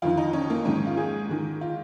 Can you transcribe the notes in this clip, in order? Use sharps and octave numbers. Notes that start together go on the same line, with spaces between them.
F2 D#3 F4
D#4
C#4
A#3
G#2 D#3 C#4
C#4
F4
G#4
G#2 D#3
F4